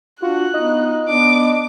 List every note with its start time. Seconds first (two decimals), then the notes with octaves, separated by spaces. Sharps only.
0.22 D4 F4 F#4 F#6
0.54 B3 D#4 D#5
1.09 B3 D4 D6